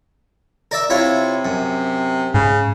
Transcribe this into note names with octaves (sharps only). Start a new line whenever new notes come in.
A#4 D5 E5
C3 E4 F4 C#5
F#2
G#2 C#3